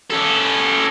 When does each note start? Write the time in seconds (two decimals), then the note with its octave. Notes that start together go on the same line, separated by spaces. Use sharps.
0.10 C#4 A4